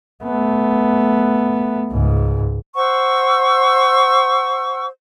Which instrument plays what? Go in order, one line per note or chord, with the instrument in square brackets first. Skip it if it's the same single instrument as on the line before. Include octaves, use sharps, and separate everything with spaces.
[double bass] A3 B3
C#2 G#2
[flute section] C5 F#5 C#6 E6